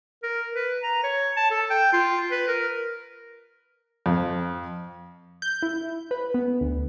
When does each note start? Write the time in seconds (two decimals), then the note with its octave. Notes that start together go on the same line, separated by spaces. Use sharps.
0.23 A#4
0.53 B4
0.83 A#5
1.04 C#5
1.37 A5
1.51 A4
1.70 G5
1.93 F4
2.31 B4
2.48 A#4
4.06 F2
5.42 G6
5.62 E4
6.11 B4
6.34 B3
6.61 D2